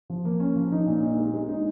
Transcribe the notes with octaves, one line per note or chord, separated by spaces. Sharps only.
F3
A#3
C#4
F3
D#4
A#2
D#4
G#3
G#3
D#4